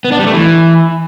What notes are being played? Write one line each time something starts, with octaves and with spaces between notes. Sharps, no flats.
B3
D4
G3
A3
E3